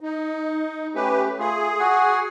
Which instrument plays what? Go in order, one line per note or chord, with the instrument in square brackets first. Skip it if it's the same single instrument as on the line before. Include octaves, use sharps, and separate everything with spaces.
[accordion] D#4
[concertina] A3 C#4 [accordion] G4 B4
[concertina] A3 F4 [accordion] G#4
[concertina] F#4 F#5 G#5